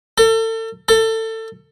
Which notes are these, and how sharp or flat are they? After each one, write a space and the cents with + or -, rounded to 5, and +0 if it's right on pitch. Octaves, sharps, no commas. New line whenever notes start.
A4 +35
A4 +25